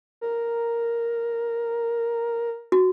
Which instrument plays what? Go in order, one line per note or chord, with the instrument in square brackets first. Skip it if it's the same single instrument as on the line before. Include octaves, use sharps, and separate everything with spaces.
[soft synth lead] A#4
[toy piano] F#4